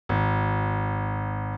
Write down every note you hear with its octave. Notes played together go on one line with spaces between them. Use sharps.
G#1